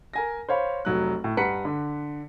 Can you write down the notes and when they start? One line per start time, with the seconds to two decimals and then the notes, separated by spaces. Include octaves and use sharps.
0.13 A#4 G#5 A#6
0.49 C5 C#5 F5 B5
0.85 F1 F#3 F#6
1.24 A2
1.37 G2 B4 F#5 A#5 B6 C#7
1.65 D3